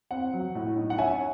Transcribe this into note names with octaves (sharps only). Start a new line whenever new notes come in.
C4 F#5
F#3
A2
D#4
F#5
C#4 E5 G#5